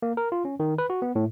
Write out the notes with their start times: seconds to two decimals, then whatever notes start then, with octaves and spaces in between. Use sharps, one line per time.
0.02 A#3
0.17 A#4
0.32 F4
0.45 C#4
0.60 D#3
0.78 B4
0.90 F#4
1.02 B3
1.15 A2